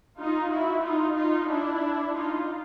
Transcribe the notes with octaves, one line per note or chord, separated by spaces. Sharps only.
D#4 F4
E4 F#4
D#4 F4
D#4 F4
D4 E4
D#4 F4